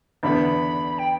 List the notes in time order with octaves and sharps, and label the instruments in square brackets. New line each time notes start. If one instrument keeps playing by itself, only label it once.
[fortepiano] E2 D3 B3 [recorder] B5
[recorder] G5